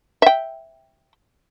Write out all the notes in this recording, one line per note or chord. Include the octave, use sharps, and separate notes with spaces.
E5 G5